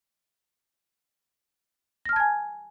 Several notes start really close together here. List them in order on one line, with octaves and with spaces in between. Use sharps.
A#6 F6 A5 G#6 G#5